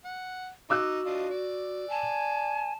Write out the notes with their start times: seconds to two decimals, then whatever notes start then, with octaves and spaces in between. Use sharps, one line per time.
0.05 F#5
0.70 D#4 F#4 D6 E6 F#6
1.06 D4 F4 D#5
1.30 D5
1.90 G#5 A5